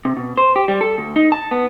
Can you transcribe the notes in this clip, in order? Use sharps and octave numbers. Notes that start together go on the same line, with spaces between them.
C3
B2
C5
G4
G3
A4
D2
D#4
A5
B3